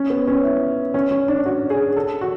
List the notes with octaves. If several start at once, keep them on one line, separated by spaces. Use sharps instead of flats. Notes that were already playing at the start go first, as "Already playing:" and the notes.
Already playing: C#4
B3
C#4
E4
C#4
C#4
D4
F#4
G#4
A4
F#4